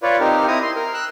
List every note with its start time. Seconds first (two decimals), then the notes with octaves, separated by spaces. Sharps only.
0.03 F4 B4 C#5 D5
0.20 C4 D#4 G4 A#4
0.47 C4 E4 A#5 D#6
0.62 C6
0.76 A#4
0.94 E6 F#6